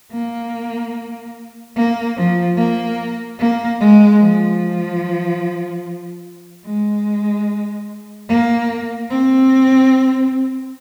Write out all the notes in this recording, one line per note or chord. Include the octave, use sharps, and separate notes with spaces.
A#3
A#3
F3
A#3
A#3
G#3
F3
G#3
A#3
C4